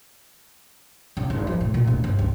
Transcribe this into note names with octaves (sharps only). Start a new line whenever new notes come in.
C#3
G#1
F3
A2
A#2
D1
G1
C#2